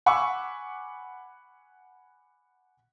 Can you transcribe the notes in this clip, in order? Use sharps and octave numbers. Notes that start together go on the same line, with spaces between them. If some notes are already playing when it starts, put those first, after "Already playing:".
F#5 G#5 B5 C#6 D6 E6